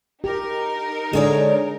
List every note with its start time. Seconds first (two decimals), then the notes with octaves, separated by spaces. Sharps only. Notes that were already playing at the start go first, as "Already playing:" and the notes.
0.24 D#4 G4 A#4
1.13 D3 G#3 G#4 C#5 D5